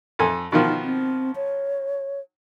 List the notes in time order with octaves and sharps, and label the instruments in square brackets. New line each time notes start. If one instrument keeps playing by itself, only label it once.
[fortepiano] F2 A4 G#5
[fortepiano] B2 D#3 F3 [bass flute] D#4
[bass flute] C4
C#5